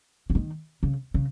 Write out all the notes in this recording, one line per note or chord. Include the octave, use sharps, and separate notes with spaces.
C#3
D#3
C#3
C#3